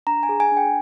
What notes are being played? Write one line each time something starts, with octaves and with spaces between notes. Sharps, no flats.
D4 A#5
G#5
G#4
G#5
D4
G5